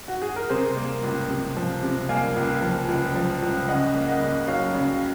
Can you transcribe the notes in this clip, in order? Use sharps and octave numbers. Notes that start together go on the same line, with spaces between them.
F#4
G#4
A#4
C3 G#4 C5
A#3
C#2
C3
F3
C3
A#3 F5 G#5
C#2
F3
C#2
F3
C#2
C#3 D#5 F#5
A#3
D#5 F#5
C#3
F#3 C#5 F5
C#3